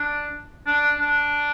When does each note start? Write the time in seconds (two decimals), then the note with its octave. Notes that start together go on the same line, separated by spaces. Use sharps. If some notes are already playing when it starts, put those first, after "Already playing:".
Already playing: D4
0.67 D4
1.00 D4